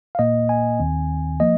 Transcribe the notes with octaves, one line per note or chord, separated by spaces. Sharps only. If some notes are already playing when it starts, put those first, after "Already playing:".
F5
A#2 A#3 D#5
G#5
D#2 D#3 C4
F3 A#3 D#5